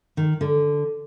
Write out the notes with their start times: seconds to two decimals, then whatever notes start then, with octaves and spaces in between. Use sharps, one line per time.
0.17 D#3
0.41 D3